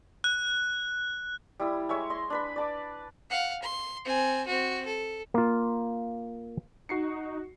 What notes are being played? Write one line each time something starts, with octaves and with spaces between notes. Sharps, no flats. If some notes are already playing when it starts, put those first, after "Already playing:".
F#6
G3 E4 D#6
G#3 C#5 E5 G#5
D#5 C6
D4 B4 B5
D5 A5 D6
F5 F#5
C6
C4 G#5
C4 F#4
A4
A#3 F4
D#4 F#4 C7 C#7